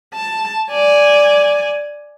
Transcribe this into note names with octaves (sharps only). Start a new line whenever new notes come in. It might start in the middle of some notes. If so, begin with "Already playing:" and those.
A5
D5 G#5